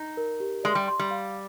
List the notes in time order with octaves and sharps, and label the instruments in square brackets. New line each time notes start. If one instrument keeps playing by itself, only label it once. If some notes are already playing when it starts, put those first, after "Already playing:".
Already playing: [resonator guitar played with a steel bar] D#4
[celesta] A#4
G4
[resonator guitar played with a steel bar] G#3 [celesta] D5
[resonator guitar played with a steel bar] G3
[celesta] C6
[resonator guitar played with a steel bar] G3
[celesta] F5